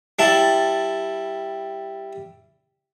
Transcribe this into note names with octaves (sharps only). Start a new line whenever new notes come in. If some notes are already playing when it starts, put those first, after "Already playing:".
G3 E4 A5